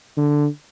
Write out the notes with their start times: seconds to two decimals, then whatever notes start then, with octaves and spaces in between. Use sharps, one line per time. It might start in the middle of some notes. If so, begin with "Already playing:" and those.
0.17 D3